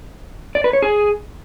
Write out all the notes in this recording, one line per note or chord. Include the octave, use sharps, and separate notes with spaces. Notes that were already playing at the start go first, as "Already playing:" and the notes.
D5
B4
C#5
G#4